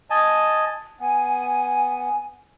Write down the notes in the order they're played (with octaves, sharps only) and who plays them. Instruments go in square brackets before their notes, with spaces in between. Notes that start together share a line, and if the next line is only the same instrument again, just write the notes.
[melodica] D#5 G#5 A5
[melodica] B3 [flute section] G#5